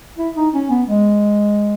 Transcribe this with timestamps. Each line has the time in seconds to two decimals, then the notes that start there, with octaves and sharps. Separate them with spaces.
0.18 E4
0.36 D#4
0.54 C#4
0.70 B3
0.88 G#3